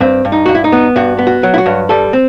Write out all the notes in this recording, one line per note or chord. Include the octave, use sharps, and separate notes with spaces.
G2 C4
G2
D#4
G2 F#4
E4
D#4
B3
G2 F#4
B3
F#4
F#3
E4
F#4
G2
G3 A4
C4